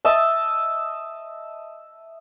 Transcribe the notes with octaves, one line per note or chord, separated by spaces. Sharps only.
D#5 E5 A5